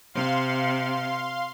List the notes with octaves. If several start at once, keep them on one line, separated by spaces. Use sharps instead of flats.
C3 F5 C6